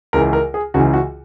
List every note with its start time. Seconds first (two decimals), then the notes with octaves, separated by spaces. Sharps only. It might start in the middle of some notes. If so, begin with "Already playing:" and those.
0.13 C#2 C#3 E3 A#4
0.33 A#4
0.54 G#4
0.74 C#2 C#3 E3 F#4
0.93 F#4